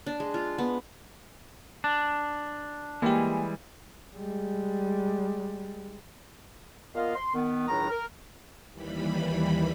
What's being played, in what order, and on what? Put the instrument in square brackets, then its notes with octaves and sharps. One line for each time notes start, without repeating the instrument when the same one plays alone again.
[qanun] D4
G#3
F4
B3
[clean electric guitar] D4
[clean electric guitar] E3 G3 G#3 [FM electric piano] A#3 G4
[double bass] G3 G#3
[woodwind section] A#2 B3 F4 A#4 D#5 F5
C6
D#3 B3
C#2 A2 D#3 F#3 D4 A#5
A#4
[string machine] D#2 E3 G3 B5